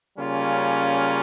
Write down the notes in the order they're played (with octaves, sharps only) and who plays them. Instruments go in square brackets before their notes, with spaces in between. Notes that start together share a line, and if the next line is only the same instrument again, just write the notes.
[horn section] C#3 G3 A#3 C#4 F4